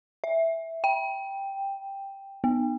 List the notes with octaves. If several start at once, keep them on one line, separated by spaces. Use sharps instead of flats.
E5
G5
B3